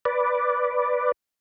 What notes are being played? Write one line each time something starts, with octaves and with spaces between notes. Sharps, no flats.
B4 D5